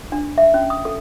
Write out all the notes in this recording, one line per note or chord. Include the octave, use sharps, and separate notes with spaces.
D4
E5
C#4
D#6
A4